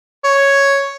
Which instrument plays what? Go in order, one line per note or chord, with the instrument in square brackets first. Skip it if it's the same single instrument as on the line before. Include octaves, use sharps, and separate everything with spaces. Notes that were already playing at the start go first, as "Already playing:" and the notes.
[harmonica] C#5